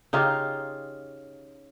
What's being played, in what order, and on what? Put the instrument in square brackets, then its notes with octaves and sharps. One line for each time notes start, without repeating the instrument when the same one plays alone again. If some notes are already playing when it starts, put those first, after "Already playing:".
[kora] C#3 D#4 F4 G4